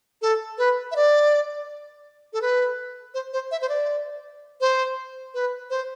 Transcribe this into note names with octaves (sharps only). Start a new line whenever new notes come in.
A4
B4
E5
D5
A4
B4
C5
C5
E5
C5
D5
C5
B4
C5